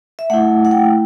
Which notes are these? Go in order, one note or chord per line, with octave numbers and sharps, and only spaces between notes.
E5
A3 E4 F#5
F#5
G5